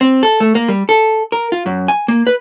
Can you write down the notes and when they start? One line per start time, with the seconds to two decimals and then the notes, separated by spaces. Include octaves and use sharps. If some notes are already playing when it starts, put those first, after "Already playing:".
0.01 C4
0.23 A4
0.40 A3
0.55 A#3
0.68 G3
0.89 A4
1.32 A#4
1.52 F4
1.66 F#2
1.88 G#5
2.08 A#3
2.27 B4